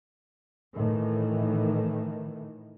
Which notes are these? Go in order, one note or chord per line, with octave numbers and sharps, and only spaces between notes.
A2 D#3 E3